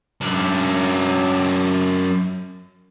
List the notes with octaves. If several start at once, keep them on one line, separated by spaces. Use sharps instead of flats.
F#2 D4